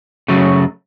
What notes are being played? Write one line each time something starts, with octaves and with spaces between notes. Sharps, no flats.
F#2 C#3 F#3 A3